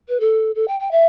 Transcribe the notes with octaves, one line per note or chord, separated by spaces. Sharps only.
B4
A4
A4
G5
G5
E5